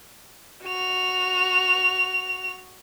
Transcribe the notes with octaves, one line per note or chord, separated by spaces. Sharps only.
F#4 F7